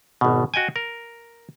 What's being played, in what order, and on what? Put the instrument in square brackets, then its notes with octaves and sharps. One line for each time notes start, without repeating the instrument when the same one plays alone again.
[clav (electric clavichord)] G#1 B2
F#4 D#5 G5 G#5
A#4